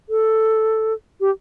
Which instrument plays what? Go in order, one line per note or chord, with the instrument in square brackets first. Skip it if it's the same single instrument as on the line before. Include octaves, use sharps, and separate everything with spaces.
[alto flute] A4
G4